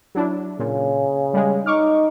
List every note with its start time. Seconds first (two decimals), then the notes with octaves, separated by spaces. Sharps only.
0.15 F#3 D4 E4
0.59 A#2 C#3
1.34 G3 G#3
1.66 D#4 C#6 D6 F6